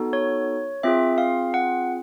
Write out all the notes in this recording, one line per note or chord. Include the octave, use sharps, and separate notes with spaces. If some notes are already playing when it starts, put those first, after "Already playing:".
Already playing: B3 D#4 F#4 A4
C#5
C4 F4 G#4 E5
F5
F#5